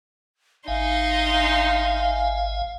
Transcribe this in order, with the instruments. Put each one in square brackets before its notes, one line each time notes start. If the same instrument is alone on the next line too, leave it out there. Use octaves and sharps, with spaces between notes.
[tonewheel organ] G#1 E5 G#5 [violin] D#4 C6 [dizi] F5